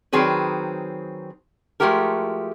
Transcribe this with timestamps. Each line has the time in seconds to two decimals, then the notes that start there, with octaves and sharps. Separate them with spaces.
0.13 D#3 F#3 C4 G#4 B4
1.80 F3 G#3 A3 F#4 G4 A#4